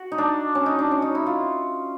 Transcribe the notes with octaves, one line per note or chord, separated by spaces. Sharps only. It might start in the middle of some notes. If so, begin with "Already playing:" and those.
Already playing: F#4
D#4
D4
C#4
D#4
D4
C#4
D#4
E4
F4